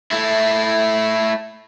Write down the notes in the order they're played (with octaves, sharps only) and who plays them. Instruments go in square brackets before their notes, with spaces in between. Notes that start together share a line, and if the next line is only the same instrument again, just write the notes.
[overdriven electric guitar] A3 E4